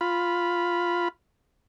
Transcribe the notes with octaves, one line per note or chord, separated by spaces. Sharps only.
F4 B5